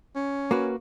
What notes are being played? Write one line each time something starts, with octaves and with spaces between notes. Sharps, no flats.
C#4
A#3 F#4 B4